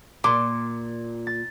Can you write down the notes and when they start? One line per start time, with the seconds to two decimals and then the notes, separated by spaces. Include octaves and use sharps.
0.24 A#2 C6 D6
1.27 A6